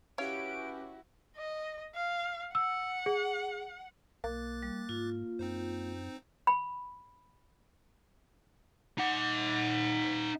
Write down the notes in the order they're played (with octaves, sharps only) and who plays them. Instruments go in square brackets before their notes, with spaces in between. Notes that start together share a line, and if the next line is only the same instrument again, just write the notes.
[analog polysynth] C#4 G4 B4 [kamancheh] E4 F#4 [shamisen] C#5 F5 [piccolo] D7
[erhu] D#5
F5
[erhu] F#5 [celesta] E6
[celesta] G#4
[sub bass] B1 [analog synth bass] A#3 [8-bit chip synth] D6 F#6 A6
[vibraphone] G3
[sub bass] G#2 [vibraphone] F4
[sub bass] F#2 [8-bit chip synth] C4 D#4 C5
[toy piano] B5
[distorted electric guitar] D#4 F#5